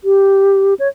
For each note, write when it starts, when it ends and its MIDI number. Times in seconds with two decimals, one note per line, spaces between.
0.04 0.74 67
0.79 0.88 73